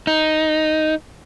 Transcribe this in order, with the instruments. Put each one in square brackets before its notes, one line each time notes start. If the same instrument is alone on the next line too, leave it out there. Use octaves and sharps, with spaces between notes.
[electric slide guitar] D#4